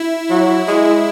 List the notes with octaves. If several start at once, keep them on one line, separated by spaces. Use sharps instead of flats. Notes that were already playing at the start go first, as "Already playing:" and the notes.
Already playing: E4
F#3
G#3